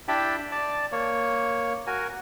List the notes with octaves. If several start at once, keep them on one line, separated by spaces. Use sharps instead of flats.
D4 E4 G4 G5 A5 B5
D5 A5
A#3 C#5
F#4 A#4 G#5